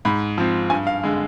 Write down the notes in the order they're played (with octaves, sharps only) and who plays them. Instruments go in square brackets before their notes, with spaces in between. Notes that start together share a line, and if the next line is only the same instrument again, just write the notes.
[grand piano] G#2 B5
F3 C4
G2 G#5
F5
D3 G#3